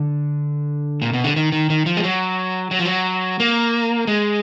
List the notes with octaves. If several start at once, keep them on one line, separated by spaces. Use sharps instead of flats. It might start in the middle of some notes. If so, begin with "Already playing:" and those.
Already playing: D3
A#2
B2
D3
D#3
D#3
D#3
F3
G#3
F#3
F#3
F3
F#3
A#3
G#3